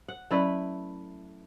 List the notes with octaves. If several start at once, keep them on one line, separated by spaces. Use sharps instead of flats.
F#5
F#3 A3 C#4 E4 B4 D5